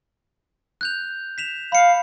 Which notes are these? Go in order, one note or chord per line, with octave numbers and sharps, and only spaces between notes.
F#6 G6 F7
B6 E7 F7
F5 B5 C#7